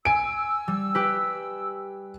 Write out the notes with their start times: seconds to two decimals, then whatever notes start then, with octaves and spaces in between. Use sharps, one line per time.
0.05 G#5 E6 D7
0.68 G3
0.95 G4 B4